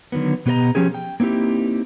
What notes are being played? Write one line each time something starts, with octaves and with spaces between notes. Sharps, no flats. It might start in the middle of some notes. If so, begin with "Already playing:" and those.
D3 D#3 F#3 B3
B2 B3 G4 B4 D#5 A#5
F3 C#4 G4 G#4
G5
A#3 C4 D#4 E4 G4